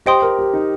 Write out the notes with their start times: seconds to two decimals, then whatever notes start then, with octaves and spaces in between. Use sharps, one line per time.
0.06 G4 C5 D#5 G5 C6 D#6
0.22 A#4
0.39 G4
0.53 D#4